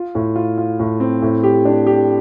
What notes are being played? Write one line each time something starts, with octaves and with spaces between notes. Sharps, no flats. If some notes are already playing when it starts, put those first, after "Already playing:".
Already playing: F4
A2
F4
F4
A2
C4
A2
G4
D4
G4